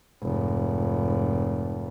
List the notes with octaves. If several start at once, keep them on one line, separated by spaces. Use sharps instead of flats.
F1 G#2